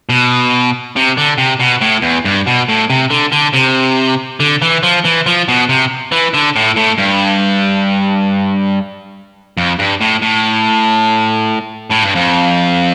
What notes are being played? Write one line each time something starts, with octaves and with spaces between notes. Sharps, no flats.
B2
C3
D3
C3
B2
A2
E2
G2
B2
A2
C3
D3
D3
C3
D3
E3
F3
E3
F3
B2
C3
E3
D3
A2
A2
G2
F2
G2
A2
A2
A2
G2
F2